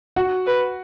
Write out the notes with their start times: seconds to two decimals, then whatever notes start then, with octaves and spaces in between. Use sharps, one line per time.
0.16 F#4 F#5
0.47 B4